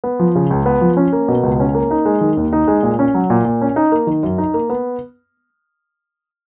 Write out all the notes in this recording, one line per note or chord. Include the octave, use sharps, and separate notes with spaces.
B3
F3
C#3
C#2
B3
F3
C#4
A#3
B2
C#2
C#4
A#3
D#4
G#3
D#3
D#2
D#4
G#3
A#2
C#4
F#3
A#2
A#2
C#4
D#4
A#3
D#3
F#2
D#4
A#3
B3